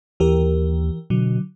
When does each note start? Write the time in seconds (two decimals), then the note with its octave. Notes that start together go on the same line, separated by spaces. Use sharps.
0.20 D#2 E3 G4 A#4
1.10 B2 D3 F#3